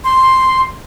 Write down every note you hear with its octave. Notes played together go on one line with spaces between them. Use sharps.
C6